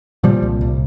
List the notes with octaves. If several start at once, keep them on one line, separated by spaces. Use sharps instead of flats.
A#2 F3 G3
C2
C2